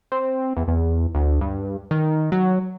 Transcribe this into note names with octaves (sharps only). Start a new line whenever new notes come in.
C4
E2
E2
D2
G2
D#3
F#3